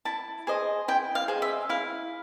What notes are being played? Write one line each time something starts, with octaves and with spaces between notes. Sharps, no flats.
E4 A5
G#4 C5 D#5
E4 G5
F5
G#4 C5 D#5
E5
E4 F5